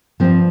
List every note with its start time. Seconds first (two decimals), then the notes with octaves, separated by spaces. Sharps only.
0.20 G2 F3 C4